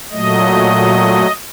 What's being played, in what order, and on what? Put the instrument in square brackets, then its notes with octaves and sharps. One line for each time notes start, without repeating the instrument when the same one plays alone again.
[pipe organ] A#2 F#3 A3 D#5